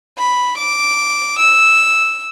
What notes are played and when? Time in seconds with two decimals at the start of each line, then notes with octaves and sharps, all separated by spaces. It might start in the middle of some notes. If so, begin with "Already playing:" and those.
0.18 B5
0.58 D6
1.39 E6